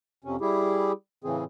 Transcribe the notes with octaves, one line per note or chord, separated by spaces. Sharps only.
F2 C3 C#4
G3 E4 G4 G#4
A2 C#3 E3 C4 G#4